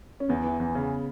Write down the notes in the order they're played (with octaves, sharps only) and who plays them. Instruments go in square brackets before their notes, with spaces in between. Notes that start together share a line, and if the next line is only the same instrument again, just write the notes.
[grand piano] C#4
[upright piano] E2 [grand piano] B3
[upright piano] E3
E2
C#3